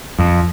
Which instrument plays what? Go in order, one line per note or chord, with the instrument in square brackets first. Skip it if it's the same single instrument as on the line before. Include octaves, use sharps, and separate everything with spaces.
[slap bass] F2